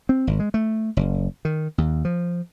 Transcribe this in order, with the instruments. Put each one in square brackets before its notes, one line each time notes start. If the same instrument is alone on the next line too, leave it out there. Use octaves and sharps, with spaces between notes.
[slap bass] C4
G#1
G#3
A3
F#1
D#3
D#2
F3